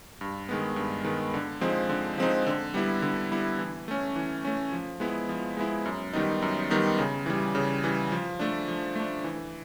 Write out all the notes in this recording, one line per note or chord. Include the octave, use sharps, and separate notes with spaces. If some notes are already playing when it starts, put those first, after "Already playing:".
G2
D#3 G#3 B3
G2
D#3 G#3 B3
D3
F3 G#3 C4 D#4
D3
F3 G#3 C4 D#4
D3
G3 B3 E4
D3
G3 B3 E4
E3
A3 C#4
E3
A3 C#4
F3
G#3 B3 E4
F3
G#3 B3 E4
F#2
D#3 G3 B3 D#4
F#2
D#3 G3 B3 D#4
C#3
E3 G3
C#3
E3 G3
F3
A3 D4
F3
A3 D4
E3